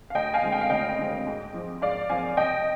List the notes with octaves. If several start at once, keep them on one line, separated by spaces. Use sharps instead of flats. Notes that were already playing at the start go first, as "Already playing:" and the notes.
F5
D2 D#5 G5
F5 G#5
D3 G#3 C4
G5
F5
D2 D#5 G5
D3 G#3 C4
G#2
F3 C4
G#2 D5 F5
F3 C4 F5 G#5
C2 D#5 G5